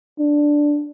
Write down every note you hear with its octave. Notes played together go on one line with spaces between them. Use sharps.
D4